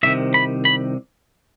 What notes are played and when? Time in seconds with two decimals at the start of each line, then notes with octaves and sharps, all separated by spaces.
0.03 C2 C3 D#3 E5
0.34 B5
0.65 B5